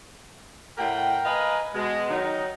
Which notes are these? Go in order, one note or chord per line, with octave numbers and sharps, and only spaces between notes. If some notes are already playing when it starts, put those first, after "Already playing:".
A2 A#4 F#5 G5
A#4 B4 D#5 F5 G#5
B2 G#3
D#3 F#3 D#4